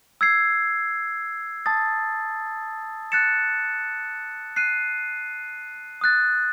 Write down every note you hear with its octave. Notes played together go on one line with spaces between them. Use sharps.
E6 G#6 C7
A5 D#6 A6
F#6 A6 C#7 E7
F#6 C7 D#7
D#6 F#6 A6